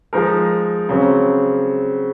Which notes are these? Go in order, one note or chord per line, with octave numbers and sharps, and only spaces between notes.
F3 G#3 D#4 A#4
C#3 F#3 C4